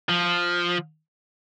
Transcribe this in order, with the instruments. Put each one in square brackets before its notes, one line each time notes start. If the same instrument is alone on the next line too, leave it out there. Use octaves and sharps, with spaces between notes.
[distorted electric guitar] F3